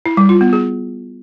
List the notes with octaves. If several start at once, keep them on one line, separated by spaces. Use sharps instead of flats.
E4
G3
F4
B3
G#4